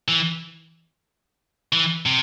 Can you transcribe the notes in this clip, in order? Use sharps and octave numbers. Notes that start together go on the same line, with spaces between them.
E3
E3
C3